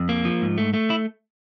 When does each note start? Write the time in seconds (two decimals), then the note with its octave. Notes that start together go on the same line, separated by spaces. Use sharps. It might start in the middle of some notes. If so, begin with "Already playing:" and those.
Already playing: F2
0.09 A#3
0.25 F3
0.42 G#2
0.58 A3
0.73 A3
0.90 E4